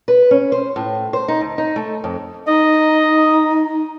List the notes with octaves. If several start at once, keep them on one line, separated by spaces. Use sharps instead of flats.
B4
C#4
C5
A2
C5
D#4
D2
D#4
A3
F2
D#4 D#5